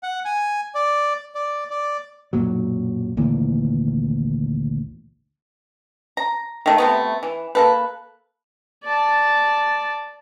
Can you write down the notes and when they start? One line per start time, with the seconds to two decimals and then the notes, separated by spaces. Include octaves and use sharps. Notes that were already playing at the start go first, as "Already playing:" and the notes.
0.03 F#5
0.25 G#5
0.75 D5
1.35 D5
1.70 D5
2.33 B1 F#2 A#2 F#3
3.17 G#1 D2 A#2 E3
6.17 A#5
6.66 D#3 A3
6.78 C3 A3 B3
7.23 E3
7.55 A#3 A4 B4
8.84 D5 A5